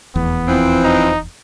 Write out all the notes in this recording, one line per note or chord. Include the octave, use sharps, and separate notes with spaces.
F1 E2 B3
E3 F3 C4
D#4